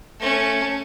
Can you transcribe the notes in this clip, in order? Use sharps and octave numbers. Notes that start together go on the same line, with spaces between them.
A3 C#4